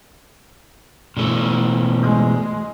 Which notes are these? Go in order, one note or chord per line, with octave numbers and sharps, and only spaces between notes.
B2 E3 A3
G#3